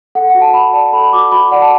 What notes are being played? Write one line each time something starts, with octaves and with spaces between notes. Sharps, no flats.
A4 F#5
F#5
F#4
A5
F#4 B5
D5 A5
A4 B5
B5
F#4 D6
F#4 B5
D5 F#5
A5